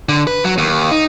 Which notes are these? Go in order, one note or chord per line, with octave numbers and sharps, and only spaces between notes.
D3
B4
F#3
D#2
D#4